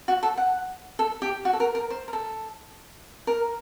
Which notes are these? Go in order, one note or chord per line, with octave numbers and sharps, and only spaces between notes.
F#4
A4
F#5
A4
G4
F#4
A4
A#4
A#4
C5
A#4
A4
A#4